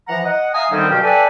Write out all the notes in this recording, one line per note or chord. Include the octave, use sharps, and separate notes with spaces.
E3 F3 F#5 A#5
D#5 F#5
E5 F5 G#5 A#5 D#6
D3 D#3 G3 C4 C#4 D#4
G2 B2 F#3 G4 F5 G5
A4 B4 D5 E5 G5 G#5